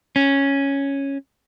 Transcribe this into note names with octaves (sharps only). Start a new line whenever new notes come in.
C#4